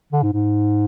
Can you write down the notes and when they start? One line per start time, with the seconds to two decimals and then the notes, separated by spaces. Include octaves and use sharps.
0.13 D3
0.23 G#2
0.33 G#2